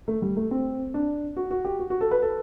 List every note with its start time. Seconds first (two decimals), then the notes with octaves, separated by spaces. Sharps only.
0.08 A3
0.22 G3
0.37 A3
0.51 C4
0.94 D4
1.37 F#4
1.51 F#4
1.64 G4
1.79 F#4
1.90 F#4
2.01 A4
2.11 B4
2.22 A4